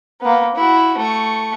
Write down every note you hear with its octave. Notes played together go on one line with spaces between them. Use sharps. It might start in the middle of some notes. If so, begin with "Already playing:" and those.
A#3 B3
E4 F#4
A3 C#6